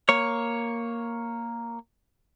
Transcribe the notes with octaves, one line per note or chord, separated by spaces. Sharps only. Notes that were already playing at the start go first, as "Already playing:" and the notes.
A#3 C#5